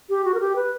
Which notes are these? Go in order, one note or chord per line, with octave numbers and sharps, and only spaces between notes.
G4
F#4
A#4
G4
B4